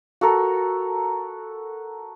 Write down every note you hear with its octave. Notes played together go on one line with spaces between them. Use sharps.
F#4 A4 A#4